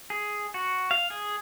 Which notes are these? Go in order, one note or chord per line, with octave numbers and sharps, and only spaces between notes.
G#4
F#4
F5
G#4